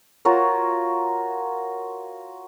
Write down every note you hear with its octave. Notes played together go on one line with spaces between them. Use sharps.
F4 F#4 A#4 C#5